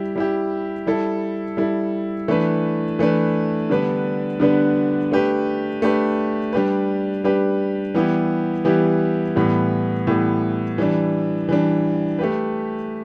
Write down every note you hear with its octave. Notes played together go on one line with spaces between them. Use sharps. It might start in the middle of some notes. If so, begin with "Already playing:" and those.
Already playing: G3 E4 G4
G3 E4 G4
G3 E4 A4
G3 E4 A4
E3 A3 D4 B4
E3 A3 D4 B4
D3 G3 B3 D4 B4
D3 G3 B3 D4 B4
A3 D4 G4 B4
A3 D4 G4 B4
G3 D4 G4 B4
G3 D4 G4 B4
E3 G3 B3 E4 G4
E3 G3 B3 E4 G4
A2 E3 G3 B3
A2 E3 G3 B3
E3 G3 D4
E3 G3 D4
A3 G4 B4